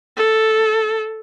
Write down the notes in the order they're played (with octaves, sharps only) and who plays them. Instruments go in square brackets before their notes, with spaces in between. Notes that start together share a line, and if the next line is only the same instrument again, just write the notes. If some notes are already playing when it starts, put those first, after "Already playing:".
[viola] A4